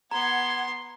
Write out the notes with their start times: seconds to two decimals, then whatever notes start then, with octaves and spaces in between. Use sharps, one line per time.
0.11 B3 F#5 A#5 C6 G#6